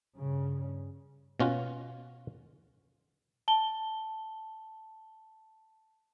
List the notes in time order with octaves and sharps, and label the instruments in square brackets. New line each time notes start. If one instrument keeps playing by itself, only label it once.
[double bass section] G2 C#3
[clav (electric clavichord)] B2 C#4 F4 F#4
[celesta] A5 G7